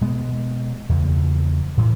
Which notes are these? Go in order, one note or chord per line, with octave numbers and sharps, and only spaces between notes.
B2 G#3 B3
E2 C#3 F3 A#3
A2 E3